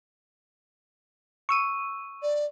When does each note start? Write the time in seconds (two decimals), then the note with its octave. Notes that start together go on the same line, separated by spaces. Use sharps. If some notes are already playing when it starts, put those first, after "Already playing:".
1.49 C#6 E6 D#7
2.22 D5